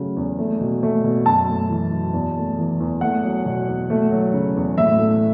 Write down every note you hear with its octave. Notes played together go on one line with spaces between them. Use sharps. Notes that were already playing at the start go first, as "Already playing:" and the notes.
Already playing: C#3 F#3 A3
E2
A3
B2
A3
B2
F#2 A5
A3
E3
F#2
E2
A3
E3
E2
A3 F#5
F#3
B2
E2
A3
F#3
C#3
E2
A2 E5
A3